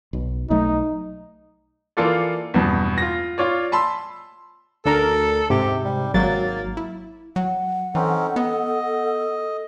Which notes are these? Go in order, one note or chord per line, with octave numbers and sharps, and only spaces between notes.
B1 B2
B1 F#3 A3 D#4
E3 A#3 F4 A4 D5
E2 G2 B2
F4 A#6
F4 C#5 D5
A5 B5 C6 E6
D2 D4 A4 A#4
G#2 C3 G4
G3
G#1 F#3 A#3 A6
E4
F#3 F#5
E3 C4 C#4 D#4 A4
B3 D#5